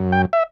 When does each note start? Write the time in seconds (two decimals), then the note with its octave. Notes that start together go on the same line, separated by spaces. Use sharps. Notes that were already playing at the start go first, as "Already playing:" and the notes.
Already playing: F#2
0.12 G5
0.33 E5